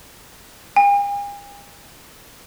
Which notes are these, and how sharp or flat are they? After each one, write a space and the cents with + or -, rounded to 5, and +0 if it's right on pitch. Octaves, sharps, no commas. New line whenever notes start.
G#5 -45